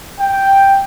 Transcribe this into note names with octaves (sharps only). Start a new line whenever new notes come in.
G5